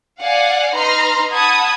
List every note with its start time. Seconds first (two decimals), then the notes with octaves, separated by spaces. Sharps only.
0.22 D5 F5 F#5 G#5
0.74 D#4 B4 A#5 C6 F6
1.32 F#5 A5 B5 D#6 G#6